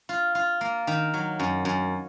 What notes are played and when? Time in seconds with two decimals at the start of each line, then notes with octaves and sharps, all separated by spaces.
0.09 F4
0.35 F4
0.61 A#3
0.87 D#3
1.14 F#3
1.40 F#2
1.65 F#2